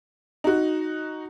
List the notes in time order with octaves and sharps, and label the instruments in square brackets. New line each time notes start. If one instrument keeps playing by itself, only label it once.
[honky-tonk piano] D#4 F#4